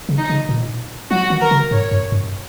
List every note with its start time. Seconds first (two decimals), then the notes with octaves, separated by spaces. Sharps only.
0.09 C#3
0.18 D#4
0.30 C#3
0.49 A#2
1.11 F#3 F#4
1.30 D#3
1.41 A#4
1.51 C#3
1.71 G#2 C#5
1.91 F#2
2.12 F#2